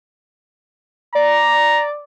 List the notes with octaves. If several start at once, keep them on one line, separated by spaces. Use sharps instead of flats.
D5 A#5